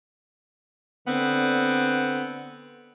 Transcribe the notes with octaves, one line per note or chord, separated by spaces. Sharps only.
D3 B3 C4